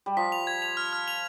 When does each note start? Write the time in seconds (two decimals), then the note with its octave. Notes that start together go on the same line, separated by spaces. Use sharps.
0.06 G3
0.17 F3 B6
0.32 F7
0.47 G#6
0.62 F7
0.77 F6
0.93 F6
1.08 F7